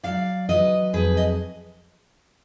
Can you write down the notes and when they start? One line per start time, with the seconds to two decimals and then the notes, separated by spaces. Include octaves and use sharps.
0.03 F#3 D5 F5
0.49 F#3 B4 D#5
0.93 F2 G#4 B4
1.17 D#5